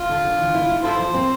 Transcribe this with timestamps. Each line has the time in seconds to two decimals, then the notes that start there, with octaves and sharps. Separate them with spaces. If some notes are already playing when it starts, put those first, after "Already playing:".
Already playing: F4
0.09 D3
0.24 D3
0.38 E3
0.55 E4
0.69 E4
0.84 E4 F4 A4 C5
0.99 F3
1.14 C4